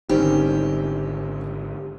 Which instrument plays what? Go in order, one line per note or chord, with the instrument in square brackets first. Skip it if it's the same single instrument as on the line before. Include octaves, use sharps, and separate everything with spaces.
[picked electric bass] G#1 D3 [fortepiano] D#3 [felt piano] G3 C4 C#4 [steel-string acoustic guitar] G4